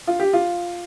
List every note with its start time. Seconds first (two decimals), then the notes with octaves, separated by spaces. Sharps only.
0.07 F4
0.19 G4
0.33 F4